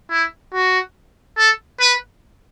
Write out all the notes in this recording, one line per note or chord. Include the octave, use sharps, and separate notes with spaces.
E4
F#4
A4
B4